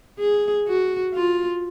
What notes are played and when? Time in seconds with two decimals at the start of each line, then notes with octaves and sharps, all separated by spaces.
0.20 G#4
0.67 F#4
1.14 F4